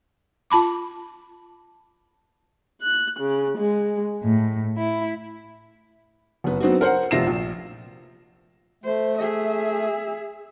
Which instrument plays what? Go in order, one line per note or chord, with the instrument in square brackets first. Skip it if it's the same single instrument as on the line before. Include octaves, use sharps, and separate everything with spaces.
[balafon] F4 A5 B5 D6
[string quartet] F#6
C#3
G#3
A2
E4
[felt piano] F#1 B3
F#3 B3 C4 D4 D#4 F#4
A#4 C5 F#5
F1 C3 F4 A#6 C7 E7
A#1
[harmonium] A3 [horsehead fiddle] C5
[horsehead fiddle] G#4 E5